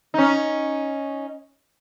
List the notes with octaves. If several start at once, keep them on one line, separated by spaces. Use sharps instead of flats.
C#4 D#4